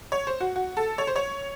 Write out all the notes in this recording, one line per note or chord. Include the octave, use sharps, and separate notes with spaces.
C#5
C5
F#4
F#4
A4
C#5
C5
C#5